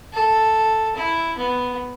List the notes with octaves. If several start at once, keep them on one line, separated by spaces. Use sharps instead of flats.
A4
E4
B3